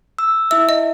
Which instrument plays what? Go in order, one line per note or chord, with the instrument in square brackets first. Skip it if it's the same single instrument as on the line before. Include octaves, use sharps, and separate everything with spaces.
[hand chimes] E6
[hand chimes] E4 E5 [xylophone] E6
[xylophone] D#5